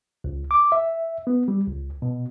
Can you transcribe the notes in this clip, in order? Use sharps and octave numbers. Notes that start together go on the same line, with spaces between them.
C#2
D6
E5
B3
G3
C#2
B2